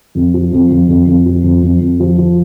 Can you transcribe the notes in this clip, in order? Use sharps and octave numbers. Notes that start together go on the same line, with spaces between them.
F2
F3
F2
F2
F2
F2
F3
F2
F2
F2
F3
F3